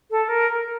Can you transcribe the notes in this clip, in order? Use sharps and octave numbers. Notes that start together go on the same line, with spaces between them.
A4
A#4